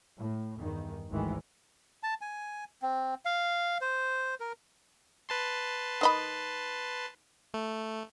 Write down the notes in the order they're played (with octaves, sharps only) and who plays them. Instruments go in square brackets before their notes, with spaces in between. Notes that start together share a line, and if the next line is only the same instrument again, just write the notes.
[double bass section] A2
E2 G2 D#3
G#1 D2 D#3 E3 G#3
[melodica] A5
G#5
C4
F5
C5
A#4
[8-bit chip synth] B4 A5 C6
[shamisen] D#3 D#5 B5
[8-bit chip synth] A3